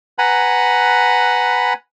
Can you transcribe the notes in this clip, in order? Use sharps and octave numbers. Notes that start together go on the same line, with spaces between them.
B4 F#5 G#5 A#5 B5